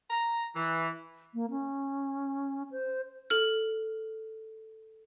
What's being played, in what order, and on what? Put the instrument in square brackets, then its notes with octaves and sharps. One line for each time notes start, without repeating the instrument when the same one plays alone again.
[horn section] A#5
E3
[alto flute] A#3
C#4
C5
[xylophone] A4 F6